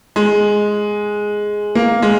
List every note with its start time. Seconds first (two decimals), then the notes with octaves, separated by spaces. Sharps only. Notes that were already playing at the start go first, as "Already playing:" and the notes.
0.16 G#3
1.75 A#3
2.02 G#3